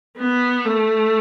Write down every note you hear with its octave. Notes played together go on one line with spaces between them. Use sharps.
B3
A3